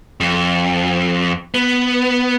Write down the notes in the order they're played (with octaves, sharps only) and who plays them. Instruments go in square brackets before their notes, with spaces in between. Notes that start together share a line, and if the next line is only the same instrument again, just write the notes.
[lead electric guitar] F2
B3